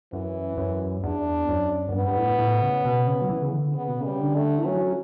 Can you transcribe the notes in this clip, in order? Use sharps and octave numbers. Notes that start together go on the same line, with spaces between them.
F#2 E3
F#2
E2 D4
F#2
F#2
G2 B3
G2
A2
A2
C#3
B2
C#3
F#3
E3
C#3
D3
C#3 B3
B2
C#3 G3
D3
A3
E3
F#3 C#4